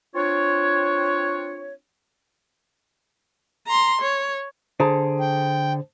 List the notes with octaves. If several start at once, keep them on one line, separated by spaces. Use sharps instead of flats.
C4 D4 F4 C#5
A#5 C6
C#5
D3 G#4 C5 A5 A#5
G5